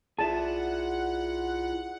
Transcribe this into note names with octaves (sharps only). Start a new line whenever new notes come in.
B1 E4 F4 G#4 D5 E5 F#5 A5